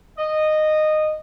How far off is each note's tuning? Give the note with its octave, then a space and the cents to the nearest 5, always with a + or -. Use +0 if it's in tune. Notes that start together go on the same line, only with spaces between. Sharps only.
D#5 -15